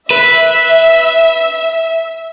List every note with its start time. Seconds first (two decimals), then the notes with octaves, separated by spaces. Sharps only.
0.11 B4 E5